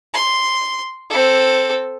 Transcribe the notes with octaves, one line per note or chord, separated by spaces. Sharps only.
C6
C4 A4